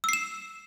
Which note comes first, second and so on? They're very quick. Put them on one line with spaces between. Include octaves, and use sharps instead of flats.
E6 C7 E7